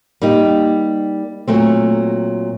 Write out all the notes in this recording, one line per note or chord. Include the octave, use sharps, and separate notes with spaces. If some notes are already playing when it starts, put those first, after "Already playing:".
G3 A#3 D#4 G4
A#2 F#3 A3 C4